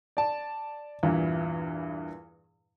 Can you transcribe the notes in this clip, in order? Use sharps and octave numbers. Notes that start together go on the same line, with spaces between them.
D5 A5
E2 G2 A#2 E3